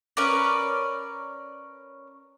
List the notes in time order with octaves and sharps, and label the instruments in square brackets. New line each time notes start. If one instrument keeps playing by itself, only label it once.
[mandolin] C#4 A#4 B4 D5